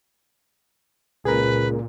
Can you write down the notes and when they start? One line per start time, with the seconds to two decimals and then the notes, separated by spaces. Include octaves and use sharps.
1.25 C#2 A#2 G#4 A#4 B4